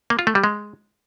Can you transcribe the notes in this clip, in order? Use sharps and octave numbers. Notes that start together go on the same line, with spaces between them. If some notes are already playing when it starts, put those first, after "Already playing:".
A#3
F4
A3
G3
G#3